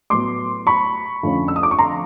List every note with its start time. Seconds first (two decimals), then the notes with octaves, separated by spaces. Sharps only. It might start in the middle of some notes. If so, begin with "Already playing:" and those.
0.10 A2 F#3 B3 C6 D6
0.67 B5 C#6
1.23 F2 D3 F3 A3 C#4
1.48 E6
1.56 D#6
1.63 D6
1.71 C#6
1.78 A#5 C6